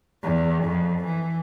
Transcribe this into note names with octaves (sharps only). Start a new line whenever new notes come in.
E2
F2
E3